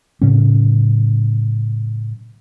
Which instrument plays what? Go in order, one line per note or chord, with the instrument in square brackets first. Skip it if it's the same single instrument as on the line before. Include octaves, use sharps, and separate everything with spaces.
[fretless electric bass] A2 C#3 F#3 C#4